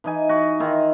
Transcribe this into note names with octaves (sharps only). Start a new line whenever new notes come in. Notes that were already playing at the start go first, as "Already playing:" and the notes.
E3 D#4 G#5
F#4
D#3 E4 F4